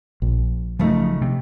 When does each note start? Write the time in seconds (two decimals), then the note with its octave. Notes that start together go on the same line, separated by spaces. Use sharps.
0.22 A#1
0.79 C#3 F3 F#3 A3 D#4
1.21 C3